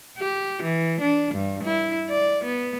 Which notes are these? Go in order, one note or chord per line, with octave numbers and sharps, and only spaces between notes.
G4
E3
D4
G2
E4
D5
B3